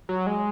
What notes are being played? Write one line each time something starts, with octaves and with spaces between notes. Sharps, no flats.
F#3
G#3